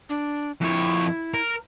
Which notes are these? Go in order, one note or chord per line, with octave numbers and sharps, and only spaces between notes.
D4
F2 E4 C#5
A#4